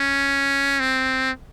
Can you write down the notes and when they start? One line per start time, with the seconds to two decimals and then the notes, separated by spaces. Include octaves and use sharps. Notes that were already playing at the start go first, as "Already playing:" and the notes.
Already playing: C#4
0.80 C4